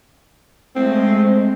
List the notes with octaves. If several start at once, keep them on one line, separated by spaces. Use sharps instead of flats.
G#3 A3 C4